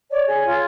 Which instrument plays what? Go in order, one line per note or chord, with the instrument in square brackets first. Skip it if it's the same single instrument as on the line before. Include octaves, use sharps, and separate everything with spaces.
[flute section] C#5 D5
G#4 C#5
F4 C#5